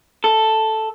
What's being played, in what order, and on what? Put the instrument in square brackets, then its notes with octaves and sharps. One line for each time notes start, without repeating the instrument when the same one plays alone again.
[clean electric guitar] A4